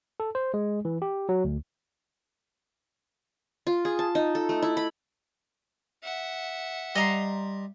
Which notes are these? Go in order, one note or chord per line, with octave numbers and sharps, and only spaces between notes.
A4
C5
G#3
E3
G4
F#3
D2
F4
G#4
A5
D#4
A4
A3
E4
B5
E5 F#5
G3 D#5 A#5 C6